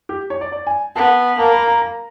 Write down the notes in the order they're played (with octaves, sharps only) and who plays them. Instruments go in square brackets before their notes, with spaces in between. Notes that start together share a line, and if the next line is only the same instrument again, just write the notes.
[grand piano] G4
C#5
D5
D5
G#5
[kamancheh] B3 [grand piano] A5
[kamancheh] A#3 [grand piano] A5
[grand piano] B5
A#5
A#5